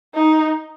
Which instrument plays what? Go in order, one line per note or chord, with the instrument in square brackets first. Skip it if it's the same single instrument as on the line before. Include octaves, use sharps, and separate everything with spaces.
[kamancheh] D#4